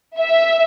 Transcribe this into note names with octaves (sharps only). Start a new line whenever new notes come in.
E5